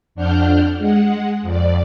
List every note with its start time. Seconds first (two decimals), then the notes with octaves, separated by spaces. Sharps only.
0.15 F2 D4 F#5 F6 G6
0.78 G#3 F#5
1.42 F2 D5